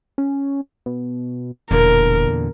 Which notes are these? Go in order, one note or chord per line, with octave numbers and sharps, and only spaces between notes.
C#4
B2
E1 E2 A#2 D3 A#4